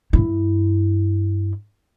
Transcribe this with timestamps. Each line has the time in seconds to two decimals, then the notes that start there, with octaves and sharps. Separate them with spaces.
0.13 G2 E4